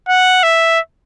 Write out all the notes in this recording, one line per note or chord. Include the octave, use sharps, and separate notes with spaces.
F#5
E5